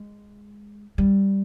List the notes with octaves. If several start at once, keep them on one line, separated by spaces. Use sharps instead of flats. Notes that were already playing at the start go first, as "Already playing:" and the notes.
Already playing: G#3
G3